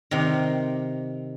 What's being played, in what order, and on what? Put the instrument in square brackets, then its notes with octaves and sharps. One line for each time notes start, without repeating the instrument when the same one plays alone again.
[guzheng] C3 D#3